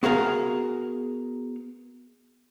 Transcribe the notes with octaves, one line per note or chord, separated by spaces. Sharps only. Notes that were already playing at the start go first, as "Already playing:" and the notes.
B3 F#4 G#4 A#4 F5 G#5